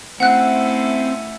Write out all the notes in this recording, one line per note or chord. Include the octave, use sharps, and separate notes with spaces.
A3 C4 C#4 E4 F#5 F#6